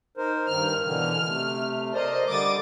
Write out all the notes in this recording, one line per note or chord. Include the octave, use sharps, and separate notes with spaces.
D#4 A#4 C5
G2 D#3 F6
B2 D3 E3 F6
C3 A3
A#4 C5 D5 D#5
D3 G3 D6 D#6 A6